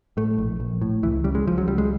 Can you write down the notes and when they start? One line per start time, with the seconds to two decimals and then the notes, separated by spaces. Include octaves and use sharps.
0.17 A2 A3
0.38 A#1
0.60 A#1
0.81 A2
1.03 C#2 E3
1.24 C#3 G3
1.35 G#3
1.46 C#2 F3
1.58 F#3
1.67 C#2 G3
1.78 G#3